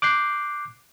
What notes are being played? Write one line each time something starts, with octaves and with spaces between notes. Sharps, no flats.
D6 F#6 G6 C7